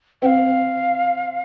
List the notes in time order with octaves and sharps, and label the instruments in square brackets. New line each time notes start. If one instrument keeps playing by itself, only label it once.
[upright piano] C4 [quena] F5 G5